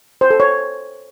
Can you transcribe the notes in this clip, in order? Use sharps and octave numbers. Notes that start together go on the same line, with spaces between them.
C5
A4
C#5